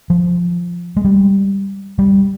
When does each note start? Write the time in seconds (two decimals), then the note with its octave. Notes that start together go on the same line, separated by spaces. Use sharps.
0.10 F3
0.97 G#3
1.05 G3
1.99 G3